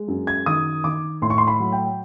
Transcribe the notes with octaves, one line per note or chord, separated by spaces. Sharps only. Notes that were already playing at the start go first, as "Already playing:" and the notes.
Already playing: G#3
F#2
G#6
D#3 D#6
D#3 D6
A2 C6
C#6
C6
B5
F#3
G5